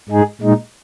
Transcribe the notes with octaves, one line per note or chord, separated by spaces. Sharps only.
G#2 G#3 D#4 G#4
A#2 G#3 D#4